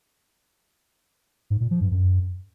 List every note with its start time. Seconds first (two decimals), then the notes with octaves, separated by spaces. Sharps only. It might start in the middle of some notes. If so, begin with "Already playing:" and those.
1.50 G#2
1.61 A#2
1.71 F3
1.81 G2
1.91 F#2